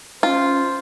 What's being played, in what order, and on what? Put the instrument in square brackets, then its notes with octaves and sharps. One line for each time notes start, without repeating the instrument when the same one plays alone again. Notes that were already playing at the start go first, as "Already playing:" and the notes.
[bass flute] C#4 [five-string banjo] F4 [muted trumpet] C5